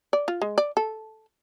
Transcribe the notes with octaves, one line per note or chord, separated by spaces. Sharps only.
D5
F4
G#3
D5
A4